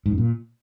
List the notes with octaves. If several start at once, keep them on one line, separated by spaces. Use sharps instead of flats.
G#2
F#2
A#2